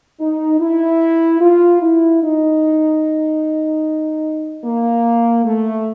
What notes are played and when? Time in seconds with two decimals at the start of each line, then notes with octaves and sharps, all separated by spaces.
0.20 D#4
0.60 E4
1.41 F4
1.82 E4
2.23 D#4
4.64 A#3
5.45 A3